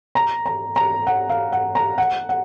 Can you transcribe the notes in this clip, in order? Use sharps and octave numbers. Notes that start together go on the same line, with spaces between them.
A#5
A#5
A#5
F#5
F5
F#5
A#5
F#5
F#5